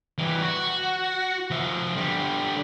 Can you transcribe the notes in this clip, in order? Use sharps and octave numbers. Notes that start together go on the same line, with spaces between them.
E3 G3
F#4
F3 E5
D3 G3